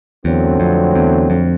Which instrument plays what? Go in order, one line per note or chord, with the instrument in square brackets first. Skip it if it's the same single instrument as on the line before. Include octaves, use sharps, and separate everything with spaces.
[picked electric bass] E2 [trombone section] D3 F#3 A3 C4
[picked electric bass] F2
E2
F2